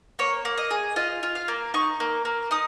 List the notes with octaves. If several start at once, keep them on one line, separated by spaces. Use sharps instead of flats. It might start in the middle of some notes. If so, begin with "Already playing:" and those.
A#3 C#5
A#3
D#5
G#4
F4 D#5
F4
F5
A#3
D#4 C#6
A#3
A#3
D#4 D#6